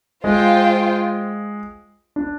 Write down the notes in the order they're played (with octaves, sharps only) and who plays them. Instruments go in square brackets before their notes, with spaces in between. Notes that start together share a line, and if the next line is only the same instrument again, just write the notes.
[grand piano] G#3 [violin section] F4 C5 G5
[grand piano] D4